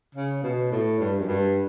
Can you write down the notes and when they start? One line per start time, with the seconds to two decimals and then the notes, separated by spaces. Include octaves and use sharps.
0.15 C#3
0.43 B2
0.71 A2
1.00 G2
1.20 F#2
1.28 G2